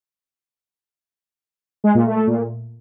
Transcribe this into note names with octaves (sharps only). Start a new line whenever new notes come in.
G#3
A#2
A3
A3
A#2